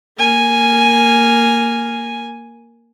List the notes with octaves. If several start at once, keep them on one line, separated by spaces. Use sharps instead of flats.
A#3 G#5